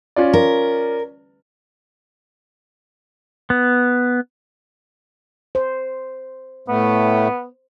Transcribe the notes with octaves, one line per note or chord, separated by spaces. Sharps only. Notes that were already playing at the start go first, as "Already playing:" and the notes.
C#4 F4 D5
A#4
B3
C5
A2 A3 B3